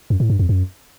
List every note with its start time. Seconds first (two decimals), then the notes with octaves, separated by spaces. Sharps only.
0.10 F#2
0.20 A2
0.30 G2
0.39 F2
0.49 F#2